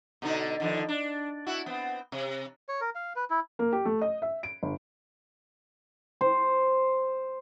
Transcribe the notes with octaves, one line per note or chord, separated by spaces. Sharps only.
B2 D3 D#4
D3 D#3 F3
D4
E4 F#4
B3 C4
C3
C#5
A#4
F5
B4
E4
A#3
G4
A3
D#5
E5
D7
G1
C5